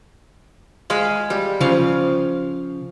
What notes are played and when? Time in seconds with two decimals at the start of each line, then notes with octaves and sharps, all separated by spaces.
0.90 G#3 F5 B5
1.30 G3
1.61 C#3 F3 F5